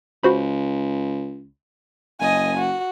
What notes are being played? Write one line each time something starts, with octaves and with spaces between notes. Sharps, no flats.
C#2 F#4 C5 B5
F#1 D#5 G#5
F#4